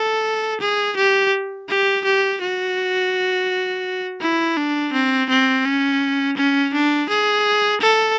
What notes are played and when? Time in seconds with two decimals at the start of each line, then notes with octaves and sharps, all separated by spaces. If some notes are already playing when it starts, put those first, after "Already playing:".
Already playing: A4
0.61 G#4
0.97 G4
1.69 G4
2.05 G4
2.42 F#4
4.21 E4
4.57 D4
4.93 C4
5.30 C4
5.65 C#4
6.37 C#4
6.74 D4
7.10 G#4
7.81 A4